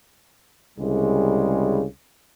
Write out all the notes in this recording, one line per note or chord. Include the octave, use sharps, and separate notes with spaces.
C2 C#3 G3 G#3